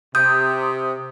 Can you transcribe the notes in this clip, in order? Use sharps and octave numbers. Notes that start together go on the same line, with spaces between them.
C3 D#6 G6